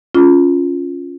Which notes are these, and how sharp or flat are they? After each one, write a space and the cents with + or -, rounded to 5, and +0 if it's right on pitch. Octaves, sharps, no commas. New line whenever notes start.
C#4 +10 F4 +0 D6 -30